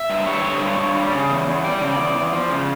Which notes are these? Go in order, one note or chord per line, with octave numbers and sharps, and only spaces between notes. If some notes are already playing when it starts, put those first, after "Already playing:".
Already playing: E5
G2
G3 C#5
D3
G2
G2
G3
C#3
E2
E2
G3 D5
C#3
E2
E2
F3
C#3